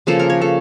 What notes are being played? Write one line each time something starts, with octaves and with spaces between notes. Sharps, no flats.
C#3 F3 A#3 A4
A#4
C#5
A4